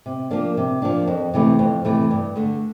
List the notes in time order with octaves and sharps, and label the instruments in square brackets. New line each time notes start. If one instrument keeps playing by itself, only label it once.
[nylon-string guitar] C3
F3 A#3 D4
C3
F3 A#3 D4
F2
C3 E3 A3
F2
C3 E3 A3
G2
D3 A3